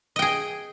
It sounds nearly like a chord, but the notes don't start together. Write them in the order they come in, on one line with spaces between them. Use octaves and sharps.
D#5 G5 G#4